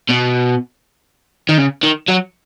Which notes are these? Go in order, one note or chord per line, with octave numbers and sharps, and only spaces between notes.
B2
D#3
C#3
D#3
F#3